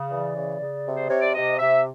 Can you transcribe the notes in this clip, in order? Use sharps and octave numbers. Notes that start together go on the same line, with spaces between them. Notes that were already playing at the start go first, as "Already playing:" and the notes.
Already playing: C#3
E3 D5
C#3
C#3
C3
C5
C3 C#5
D5
C3 D#5
C3 E5